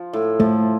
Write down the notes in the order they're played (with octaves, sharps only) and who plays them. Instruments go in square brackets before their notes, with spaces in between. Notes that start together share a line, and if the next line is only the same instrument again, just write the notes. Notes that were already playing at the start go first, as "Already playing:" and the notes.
Already playing: [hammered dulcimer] F3 F4
A2
[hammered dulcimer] F3 [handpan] A3